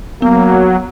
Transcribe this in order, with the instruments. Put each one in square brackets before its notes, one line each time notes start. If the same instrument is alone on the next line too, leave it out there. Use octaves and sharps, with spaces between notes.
[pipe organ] F#3 [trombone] A#3 [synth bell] B3